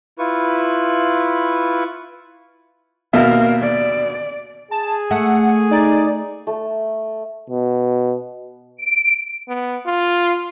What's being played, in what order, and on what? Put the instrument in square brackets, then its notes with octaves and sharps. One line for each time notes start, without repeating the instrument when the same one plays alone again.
[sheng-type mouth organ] E4 F4 B4 C#6
[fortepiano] D#2 B2 E5 [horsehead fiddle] A#4 F5
[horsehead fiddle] D5
[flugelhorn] G#4 [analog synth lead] A5
[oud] A3 [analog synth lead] F#5
[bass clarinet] D#4 [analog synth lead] D5
[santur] A3
[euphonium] B2
[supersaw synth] D7
[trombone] B3
F4